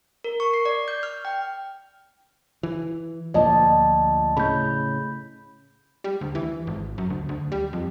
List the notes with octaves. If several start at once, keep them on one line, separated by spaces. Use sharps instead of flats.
A#4
C#6
C7
D5
G6
F6
G5
E3
D2 A#2 F3 D5 D#5 A5
A2 C#3 B5 G6
G3
D2
E3
G#1
F#2
D2
D2
G3
F2